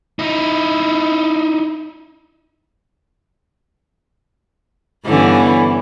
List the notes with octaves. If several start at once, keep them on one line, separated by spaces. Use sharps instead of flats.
D#4 E4
G2 D3 E3 B3 C#4 E4